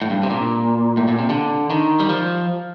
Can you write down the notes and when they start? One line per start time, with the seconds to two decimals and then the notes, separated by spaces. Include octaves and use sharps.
0.02 A2
0.10 G2
0.23 C3
0.30 A#2
0.97 A2
1.08 A#2
1.19 C3
1.30 D3
1.70 D#3
2.00 G3
2.09 F3